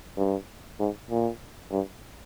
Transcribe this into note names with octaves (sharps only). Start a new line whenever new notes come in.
G2
G#2
A#2
G2